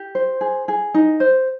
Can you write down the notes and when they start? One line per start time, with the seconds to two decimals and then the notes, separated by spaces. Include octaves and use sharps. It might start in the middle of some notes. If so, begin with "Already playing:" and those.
Already playing: G4
0.15 C5
0.41 G#4
0.68 G#4
0.94 D#4
1.20 C5